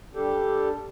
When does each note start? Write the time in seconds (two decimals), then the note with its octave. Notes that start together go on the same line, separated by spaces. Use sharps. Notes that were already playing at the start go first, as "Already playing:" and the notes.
0.15 G3 D4 G4 A4